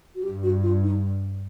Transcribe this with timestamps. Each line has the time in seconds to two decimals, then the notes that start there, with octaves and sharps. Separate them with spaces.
0.15 F#4
0.23 G2 G4
0.43 F#4
0.63 F4
0.84 D#4